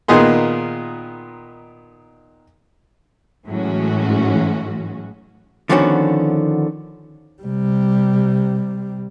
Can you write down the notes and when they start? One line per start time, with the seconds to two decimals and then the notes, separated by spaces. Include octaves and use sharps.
0.08 A#2 D#3 B3 D#4 G#4 C6
3.47 A2 E3 F#3 G#3 C#4 F#4
5.69 D3 D#3 F3 B3 C#4 F#4
7.43 C3 G3